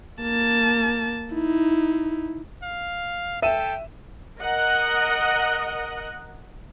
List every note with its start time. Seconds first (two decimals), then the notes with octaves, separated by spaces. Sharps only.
0.22 A#3 A5
1.34 D#4 E4
2.64 F5
3.42 A4 E5 G5 D#7 E7
4.40 A#4 D#5 F#5